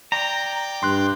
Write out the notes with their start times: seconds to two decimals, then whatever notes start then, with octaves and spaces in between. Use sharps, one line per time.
0.12 D5 G5 A#5
0.83 G2 C6 F#6